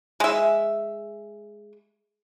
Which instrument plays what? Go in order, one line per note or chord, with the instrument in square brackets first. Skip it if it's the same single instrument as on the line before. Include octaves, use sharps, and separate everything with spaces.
[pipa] G#3 E5